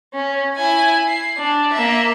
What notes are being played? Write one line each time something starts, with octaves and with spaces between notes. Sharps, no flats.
C#4
E4 G#5
C7
D4
A#3 E5